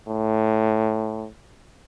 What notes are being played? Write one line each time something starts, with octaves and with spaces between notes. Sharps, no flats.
A2